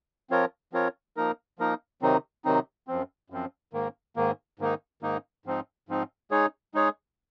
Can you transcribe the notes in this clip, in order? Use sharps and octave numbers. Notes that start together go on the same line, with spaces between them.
F3 C4 F4 A#4 C#5
F3 C4 F4 A#4 C#5
F3 A#3 D#4 A#4
F3 A#3 D#4 A#4
C3 D#3 F#3 C4 D#4
C3 D#3 F#3 C4 D#4
F#2 F3 C4
F#2 F3 C4
G#2 D#3 A#3
G#2 D#3 A#3
G#2 D#3 A#3 D#4
G#2 D#3 A#3 D#4
G#2 F3 C4 D#4
G#2 F3 C4 D#4
G#3 D#4 G#4 C#5
G#3 D#4 G#4 C#5